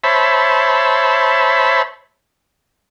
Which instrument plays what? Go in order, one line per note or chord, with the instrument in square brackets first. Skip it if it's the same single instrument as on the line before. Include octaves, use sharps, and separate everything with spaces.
[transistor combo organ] C5 C#5 E5 A5 B5